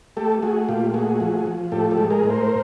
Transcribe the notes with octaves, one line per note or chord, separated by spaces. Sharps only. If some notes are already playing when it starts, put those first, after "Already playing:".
A3 G4 A4
A3 F#4 G#4
A#2 F4 G4
A3 F#4 G#4
F3
F3
A2 G4 A4
G4 A4
G#3
G#4 A#4
A2
A#4 C5